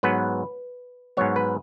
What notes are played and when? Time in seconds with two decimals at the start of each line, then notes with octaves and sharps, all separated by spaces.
0.03 G#2 F#3 B3 B4
1.17 G#2 F#3 B3 C#5
1.36 B4